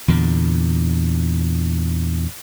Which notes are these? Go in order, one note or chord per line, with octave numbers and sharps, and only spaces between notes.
E2 A#2 D3